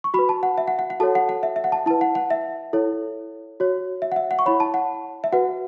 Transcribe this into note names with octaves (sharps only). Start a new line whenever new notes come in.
C#6
F#4 B4 B5
A5
F#5
E5
F#5
F#5
F#5
F#4 A4 C#5 A5
F#5
F#5
E5
E5
F#5
A5
E4 B4 A5
F#5
F#5
E5
E4 A4 C#5
F#4 C#5
E5
F#5
E5
F#5
C#6
E4 C#5 B5
A5
F#5
E5
F#4 B4 F#5